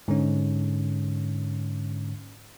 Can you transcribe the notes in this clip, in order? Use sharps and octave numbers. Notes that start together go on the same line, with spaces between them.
G#2 D3 C#4